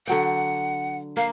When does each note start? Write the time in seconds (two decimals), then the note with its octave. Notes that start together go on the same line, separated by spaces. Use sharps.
0.07 D3 F#3 F#5 G5
1.17 A#3 F5